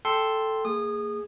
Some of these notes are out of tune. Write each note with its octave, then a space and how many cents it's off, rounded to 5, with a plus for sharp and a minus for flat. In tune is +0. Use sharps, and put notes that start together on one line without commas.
A4 +0 G5 +0 C6 +0
A#3 -30 G#4 +0 D#6 -25